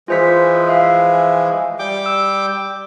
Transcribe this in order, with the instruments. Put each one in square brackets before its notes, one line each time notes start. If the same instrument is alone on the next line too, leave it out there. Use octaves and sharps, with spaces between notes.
[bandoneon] E3 F3 G#3 [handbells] F4 C5 B6
[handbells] E5 F5
[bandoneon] G3 G5 D6
[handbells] E6